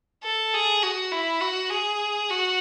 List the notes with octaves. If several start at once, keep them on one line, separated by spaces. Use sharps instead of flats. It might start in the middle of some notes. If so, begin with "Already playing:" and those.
A4
G#4
F#4
E4
F#4
G#4
F#4